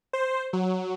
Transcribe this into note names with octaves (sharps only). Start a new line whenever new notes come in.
C5
F#3